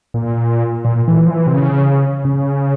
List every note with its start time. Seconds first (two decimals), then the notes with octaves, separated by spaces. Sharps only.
0.14 A#2
0.85 A#2
1.08 E3
1.26 F3
1.31 E3
1.47 C3
1.54 C#3
2.25 C#3